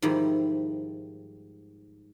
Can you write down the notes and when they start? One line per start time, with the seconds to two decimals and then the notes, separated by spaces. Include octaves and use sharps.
0.02 G#2 D#3 F3 G3 E4